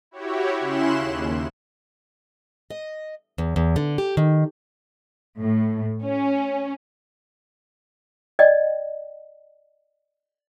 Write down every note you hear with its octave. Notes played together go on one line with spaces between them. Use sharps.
E4 F#4 G4 C#5
C#3 C#4 E4 C6 F#6 E7
D#2
D#5
E2
E2
D3
G4
D#3
A2
C#4
D5 D#5 G5